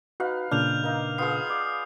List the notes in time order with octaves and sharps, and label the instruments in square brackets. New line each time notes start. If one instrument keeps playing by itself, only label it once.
[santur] D#4 B4 F5 [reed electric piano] F#4
[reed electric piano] A#2 C#3 D4 [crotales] F6 G6 F7
[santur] A#3 D#4
[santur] B3 F4 G#4 [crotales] D#6 C7
[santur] D5